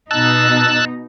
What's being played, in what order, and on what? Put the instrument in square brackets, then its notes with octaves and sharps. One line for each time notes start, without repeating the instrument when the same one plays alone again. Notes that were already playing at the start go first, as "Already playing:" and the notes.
[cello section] B2 D#4 [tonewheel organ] A5 E6 F#6